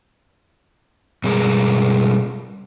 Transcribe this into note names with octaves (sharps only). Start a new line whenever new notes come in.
B2 G3 G#3 G#4 A#4